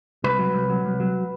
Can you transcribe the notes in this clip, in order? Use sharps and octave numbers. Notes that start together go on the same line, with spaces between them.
C2 B4
F#3
C2
F#3
C2
F#3